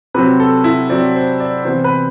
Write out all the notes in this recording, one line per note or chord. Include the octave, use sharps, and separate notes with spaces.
C3 F#3 C4 B4
A4
E4
C3 F#3 C4 D5
C5
D5
C3 E3 B3 C5
B4